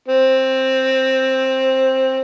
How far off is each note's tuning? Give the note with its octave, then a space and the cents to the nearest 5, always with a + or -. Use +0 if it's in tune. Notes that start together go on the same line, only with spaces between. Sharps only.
C4 +10